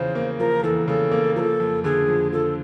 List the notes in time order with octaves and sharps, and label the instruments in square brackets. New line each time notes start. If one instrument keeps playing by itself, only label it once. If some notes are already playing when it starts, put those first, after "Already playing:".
Already playing: [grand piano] E2 C#3 F3 [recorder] C5
[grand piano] A#3
[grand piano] F3 [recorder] A#4
[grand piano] E2 [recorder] A4
[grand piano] C#3 [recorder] A4
[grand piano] A#3
[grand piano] F3 [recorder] A#4
[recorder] A4
[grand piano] F2
[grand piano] D3 [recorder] G#4
[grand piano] F2
[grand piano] F3 [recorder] A4